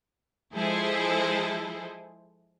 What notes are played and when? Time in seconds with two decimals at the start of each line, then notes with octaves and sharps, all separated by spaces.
0.55 F3 G#3 E4 G#4 A4 C5